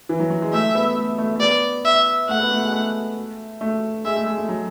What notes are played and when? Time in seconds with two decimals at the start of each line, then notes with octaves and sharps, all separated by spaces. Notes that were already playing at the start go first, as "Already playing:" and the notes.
0.09 E3
0.20 F#3
0.30 F#3
0.42 G#3
0.53 A3 E5
0.75 B3
0.97 A3
1.18 A3
1.36 A3
1.40 B3 D5
1.85 E5
2.28 A3 F#5
2.40 B3
2.51 A3
2.62 G#3
2.72 A3
3.61 A3
4.05 G#3 E5
4.16 A3
4.26 G#3
4.38 A3
4.49 F#3